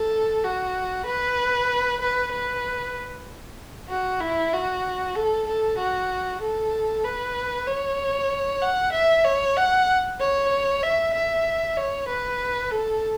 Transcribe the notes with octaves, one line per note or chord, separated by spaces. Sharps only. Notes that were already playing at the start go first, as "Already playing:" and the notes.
Already playing: A4
F#4
B4
B4
B4
F#4
E4
F#4
A4
A4
F#4
A4
B4
C#5
F#5
E5
C#5
F#5
C#5
E5
E5
C#5
B4
A4